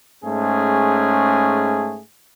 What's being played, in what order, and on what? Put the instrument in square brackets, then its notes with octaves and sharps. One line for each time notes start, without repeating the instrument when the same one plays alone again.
[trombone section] G#2 A3 C#4 G#4